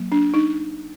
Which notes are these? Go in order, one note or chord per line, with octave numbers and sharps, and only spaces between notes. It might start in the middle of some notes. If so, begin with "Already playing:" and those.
Already playing: F#3 A#3
D4
D#4